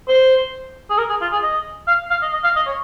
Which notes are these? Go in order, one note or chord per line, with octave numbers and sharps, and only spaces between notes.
C5
G#4
A#4
G#4
F4
G#4
D#5
F5
F5
D#5
D#5
F5
D#5
C#5